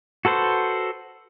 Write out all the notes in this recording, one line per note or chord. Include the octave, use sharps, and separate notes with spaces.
F#4 A4 B4 C5